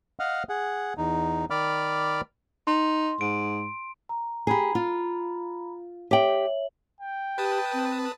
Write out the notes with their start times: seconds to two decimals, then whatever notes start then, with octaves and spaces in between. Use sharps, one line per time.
0.20 D#5 F5 F#5 F6
0.49 G#4 F#5
0.98 E2 D#4
1.50 D#3 D5 B5 D6 F6
2.67 D#4 C6
3.21 G#2 D7
4.09 A#5
4.47 G4 G#4 A#5 B5
4.75 F4
6.11 G4 C#5 E5 G5 F#7
7.01 G5
7.38 G4 B4 A5 D#6
7.73 C4